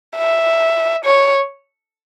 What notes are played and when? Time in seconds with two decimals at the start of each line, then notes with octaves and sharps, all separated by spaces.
0.17 E5
1.05 C#5